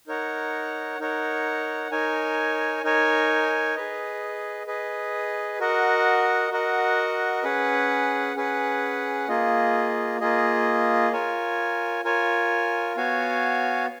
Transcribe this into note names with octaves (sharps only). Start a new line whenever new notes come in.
D#4 A#4 C#5 F#5
D#4 A#4 C#5 F#5
D#4 A#4 C#5 G#5
D#4 A#4 C#5 G#5
G#4 B4 D#5
G#4 B4 D#5
F#4 A#4 D#5 F#5
F#4 A#4 D#5 F#5
C#4 G#4 B4 F#5
C#4 G#4 B4 F#5
A#3 F4 G#4 D#5
A#3 F4 G#4 D#5
F4 A#4 C#5 G#5
F4 A#4 C#5 G#5
B3 F#4 C#5 F5 G#5